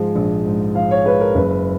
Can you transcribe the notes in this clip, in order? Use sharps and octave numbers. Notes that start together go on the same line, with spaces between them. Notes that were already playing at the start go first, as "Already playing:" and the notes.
Already playing: G#2 F3 G#3
A#1
G#2
F3 F5
C#5
G#3 B4
A#4
F#1 B4